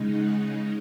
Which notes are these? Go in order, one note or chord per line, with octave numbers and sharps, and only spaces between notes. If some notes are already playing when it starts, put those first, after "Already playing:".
Already playing: C#3 G#3 D#4
F#5